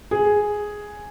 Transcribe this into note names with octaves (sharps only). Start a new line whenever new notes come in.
G#4